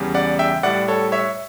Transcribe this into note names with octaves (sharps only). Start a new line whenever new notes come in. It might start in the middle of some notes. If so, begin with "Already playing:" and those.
Already playing: E2 C#3 G3
D5 F#5
E5 G5
A2 G3 D5 F#5
A4 C#5
C#5 E5